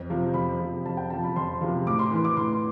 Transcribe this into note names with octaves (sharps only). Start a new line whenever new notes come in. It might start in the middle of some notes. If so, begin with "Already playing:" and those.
Already playing: F2
C3 F3
F2 B5
C3 F3
F2 A5
G5
C3 F3 A5
B5
F2 C6
C3 F3
A2 D6
C6
E3
D6
A2 C6